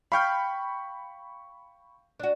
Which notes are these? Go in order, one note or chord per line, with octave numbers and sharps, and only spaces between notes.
F5 G5 B5 C#6 F6 G6
D4 F#4